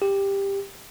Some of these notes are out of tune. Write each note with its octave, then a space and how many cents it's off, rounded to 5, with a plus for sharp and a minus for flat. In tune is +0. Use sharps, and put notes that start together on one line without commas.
G4 +10